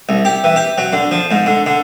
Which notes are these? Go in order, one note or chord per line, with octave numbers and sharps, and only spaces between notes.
C2
G4
E3
G4
F#3
D3
F3
G#2
D3
D3